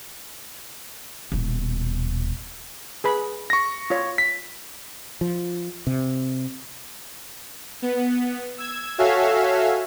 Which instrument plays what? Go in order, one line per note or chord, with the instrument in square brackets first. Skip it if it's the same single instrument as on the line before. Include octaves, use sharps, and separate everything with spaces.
[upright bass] D#1 B2
[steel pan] G#4 B4 B5
[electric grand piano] C#6 A#6
[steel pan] F4 C#5
[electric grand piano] B6
[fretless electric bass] F3
C3
[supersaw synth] B3
E6 G#6
F#4 A4 C#5 E5 F5 G#5